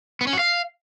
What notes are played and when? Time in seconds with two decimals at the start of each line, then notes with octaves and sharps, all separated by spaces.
0.21 B3
0.27 C#4
0.33 F#4
0.39 F5